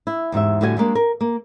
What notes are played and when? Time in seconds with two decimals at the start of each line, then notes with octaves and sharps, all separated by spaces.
0.07 E4
0.32 E2 G#2 G4 E5
0.61 A2 D3 G3 F#4 D#5 G#5
0.77 G3 G#3 A#3 D4
0.95 A#4
1.21 A#3